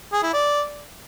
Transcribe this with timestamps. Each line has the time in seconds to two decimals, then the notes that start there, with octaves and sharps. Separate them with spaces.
0.13 G#4
0.23 E4
0.33 D5